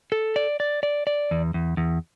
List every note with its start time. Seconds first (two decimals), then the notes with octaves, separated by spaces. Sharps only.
0.12 A4
0.36 D5
0.60 D5
0.83 D5
1.07 D5
1.31 E2
1.54 E2
1.77 E2